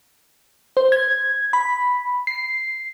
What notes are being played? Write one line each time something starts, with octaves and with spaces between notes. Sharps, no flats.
C5
G#6
B5
C7